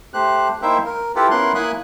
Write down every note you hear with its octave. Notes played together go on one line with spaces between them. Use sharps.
A3 G4 C5 F#6
A#3 D#4 E4 C5 E5 G5
A#4
E4 F4 G4 A4 B4
B3 C#4 E4 A#4 C6 F#6
A#3 E4 G#5 B5 D#6 F#6